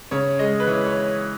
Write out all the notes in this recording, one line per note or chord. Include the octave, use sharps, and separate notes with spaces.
C#3 C#5
G#3 D#5
B4
E3 C#5
C#5